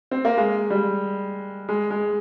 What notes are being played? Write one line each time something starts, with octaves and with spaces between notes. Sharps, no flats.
C4
A#3
G#3
G3
G#3
G#3